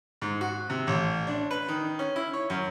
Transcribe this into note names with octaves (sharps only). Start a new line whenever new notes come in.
G#2
F#4
C3
A1
D4
B4
D#3
C#4
E4
C#5
F#2